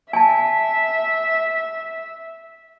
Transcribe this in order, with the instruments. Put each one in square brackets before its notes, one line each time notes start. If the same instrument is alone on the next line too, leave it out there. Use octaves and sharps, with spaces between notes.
[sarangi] E5 [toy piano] G#5 A5